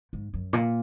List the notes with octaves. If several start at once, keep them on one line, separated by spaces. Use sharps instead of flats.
G#2
F#2
A#2